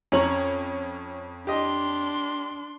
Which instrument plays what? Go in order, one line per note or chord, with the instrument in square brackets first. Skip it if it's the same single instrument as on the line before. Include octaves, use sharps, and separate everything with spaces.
[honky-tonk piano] F2 C#5 F#7 [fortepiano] C#4 A#5 C#6
[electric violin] D4 C6 [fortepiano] G4 D#5